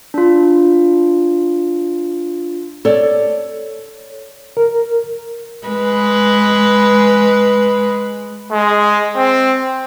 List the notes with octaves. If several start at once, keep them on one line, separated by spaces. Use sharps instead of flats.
D4 F4
A4 C#5 D5
A#4
G#3 B4
G#3
C4